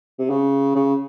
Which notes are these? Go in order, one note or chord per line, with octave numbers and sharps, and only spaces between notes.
C3
C#3
C#3